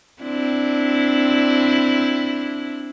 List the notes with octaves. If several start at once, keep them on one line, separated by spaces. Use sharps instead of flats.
C4 D4 E4